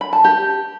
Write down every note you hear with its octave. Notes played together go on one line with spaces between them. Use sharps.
B5
A5
G4